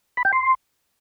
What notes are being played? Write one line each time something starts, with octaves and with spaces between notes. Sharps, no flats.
B5
G5
C6